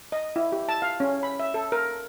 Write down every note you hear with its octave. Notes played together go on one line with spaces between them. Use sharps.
D#5
E4
G4
A5
F5
C#4
B5
E5
A4
A#4